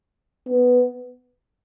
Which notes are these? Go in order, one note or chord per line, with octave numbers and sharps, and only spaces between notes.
B3